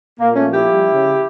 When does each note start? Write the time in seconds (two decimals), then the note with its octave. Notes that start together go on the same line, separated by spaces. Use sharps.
0.20 A#2 A#3
0.35 A3 C#4
0.44 F3
0.52 E4 G4
0.68 G3
0.92 C#3